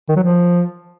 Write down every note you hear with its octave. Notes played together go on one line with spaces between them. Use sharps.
D#3
F#3
F3